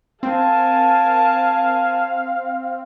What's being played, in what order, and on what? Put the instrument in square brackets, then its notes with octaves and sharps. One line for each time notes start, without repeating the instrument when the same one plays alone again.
[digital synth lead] C4 [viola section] A#4 G#5 A5 [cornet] F5